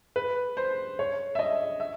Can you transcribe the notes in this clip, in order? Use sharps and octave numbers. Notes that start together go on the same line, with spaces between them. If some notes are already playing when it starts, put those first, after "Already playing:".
B4
C5
C#5
E5
D#5
E5